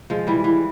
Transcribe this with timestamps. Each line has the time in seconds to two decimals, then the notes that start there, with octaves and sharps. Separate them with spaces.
0.10 F3 G#3
0.27 E3 G3
0.44 E3